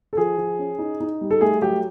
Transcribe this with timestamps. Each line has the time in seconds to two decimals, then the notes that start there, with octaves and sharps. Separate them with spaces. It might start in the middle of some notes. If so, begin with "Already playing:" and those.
0.13 A4
0.17 F3 G#4
0.38 F3
0.59 C#4
0.79 D#4
1.00 D#4
1.21 G3
1.31 A4
1.41 A3 G#4
1.62 F#3 G4